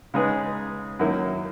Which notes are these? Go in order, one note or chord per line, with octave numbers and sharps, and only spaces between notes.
C#3 G#3 D#4 G#4 B4
F#2 D#3 A#3 E4